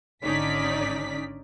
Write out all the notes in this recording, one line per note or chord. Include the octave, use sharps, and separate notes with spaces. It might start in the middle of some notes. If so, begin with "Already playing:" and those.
G#1 D3 C#4 D#4 D5 B6